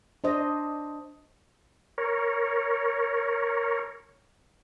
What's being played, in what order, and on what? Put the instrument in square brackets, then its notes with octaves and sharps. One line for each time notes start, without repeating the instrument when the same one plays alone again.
[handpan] D4 C5 D#5
[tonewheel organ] A#4 C#5